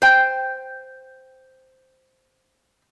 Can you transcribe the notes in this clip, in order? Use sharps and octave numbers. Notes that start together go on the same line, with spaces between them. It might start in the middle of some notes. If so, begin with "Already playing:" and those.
C5 G5